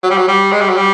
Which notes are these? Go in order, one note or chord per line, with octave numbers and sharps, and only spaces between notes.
F#3
G3
F#3
G3
G#3
G3
F#3
G3